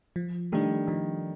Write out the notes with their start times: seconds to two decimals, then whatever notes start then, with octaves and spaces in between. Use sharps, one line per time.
0.16 F3
0.52 D#3 G3 A3 D4
0.87 D#3 F3